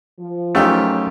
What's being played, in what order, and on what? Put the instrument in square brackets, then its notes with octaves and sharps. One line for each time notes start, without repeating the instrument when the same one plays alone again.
[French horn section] F3
[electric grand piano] F#2 C#4 G#4 [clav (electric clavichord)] A3 [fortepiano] D#4 F4 G4